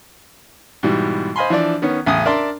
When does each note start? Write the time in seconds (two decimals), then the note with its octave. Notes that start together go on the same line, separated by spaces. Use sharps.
0.83 G#2 B2 E3 G3
1.36 C5 D#5 F5 G#5 B5 C6
1.50 E3 F3 D4 D5
1.82 D#3 B3 C#4
2.06 A1 E2 C#3 G#5 D#6
2.25 D4 A#4 D5 E5 A5 C6